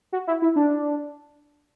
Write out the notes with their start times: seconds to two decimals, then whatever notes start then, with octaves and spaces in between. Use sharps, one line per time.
0.12 F#4
0.27 E4
0.42 E4
0.56 D4